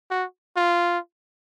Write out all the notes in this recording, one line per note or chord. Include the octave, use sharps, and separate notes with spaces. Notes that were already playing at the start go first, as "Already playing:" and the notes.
F#4
F4